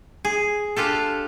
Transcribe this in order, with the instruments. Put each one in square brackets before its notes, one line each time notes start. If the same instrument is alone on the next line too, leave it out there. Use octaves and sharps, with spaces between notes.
[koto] G#4
D4 F4 G4 A4